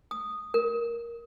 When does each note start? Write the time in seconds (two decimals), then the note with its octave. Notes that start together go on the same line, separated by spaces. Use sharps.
0.11 D#6
0.54 A#4